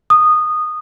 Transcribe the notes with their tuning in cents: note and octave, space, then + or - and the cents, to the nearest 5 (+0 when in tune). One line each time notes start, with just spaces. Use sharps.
D#6 -15